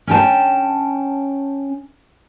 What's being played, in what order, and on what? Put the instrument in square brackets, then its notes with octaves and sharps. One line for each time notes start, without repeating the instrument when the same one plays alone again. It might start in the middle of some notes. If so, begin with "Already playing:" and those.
[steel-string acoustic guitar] C#4 G5 A5